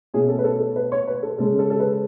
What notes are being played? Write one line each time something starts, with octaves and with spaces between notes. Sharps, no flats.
B2 A3 C#4 E4 G#4
A4
B4
A4
A4
B4
C#5
B4
A4
C#3 G#3 C#4 A4
A4
A4
B4